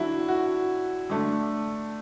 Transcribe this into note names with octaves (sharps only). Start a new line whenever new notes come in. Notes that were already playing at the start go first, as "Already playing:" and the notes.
Already playing: D3 F#3 D4 E4 F#4
F#4
D3 A3 D4